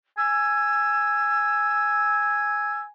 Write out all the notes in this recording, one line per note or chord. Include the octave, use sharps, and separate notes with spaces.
G#5 E6